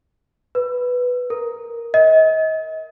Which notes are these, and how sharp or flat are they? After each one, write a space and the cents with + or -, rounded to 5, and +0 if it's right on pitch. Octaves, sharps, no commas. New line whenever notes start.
B4 +0
A#4 +0
D#5 +35